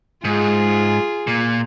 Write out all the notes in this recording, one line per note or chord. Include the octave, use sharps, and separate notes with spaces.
G#2 F4 G#4
A#2